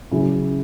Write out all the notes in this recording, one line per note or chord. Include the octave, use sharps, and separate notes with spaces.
C#3 F#3 C#4 E4